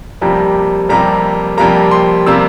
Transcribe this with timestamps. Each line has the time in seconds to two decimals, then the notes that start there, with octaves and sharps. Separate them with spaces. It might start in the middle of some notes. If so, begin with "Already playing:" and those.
0.21 F2 C3 G3 A#3 A#5
0.89 F2 C3 G3 A#3 A#5
1.57 F2 C3 G3 A#3 A#5
1.91 C6
2.26 C3 G3 A#3 E6